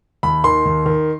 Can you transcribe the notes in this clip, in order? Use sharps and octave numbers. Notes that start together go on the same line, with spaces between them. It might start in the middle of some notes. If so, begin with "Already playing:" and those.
D#2 B5
D#3 C6
D#2
D#3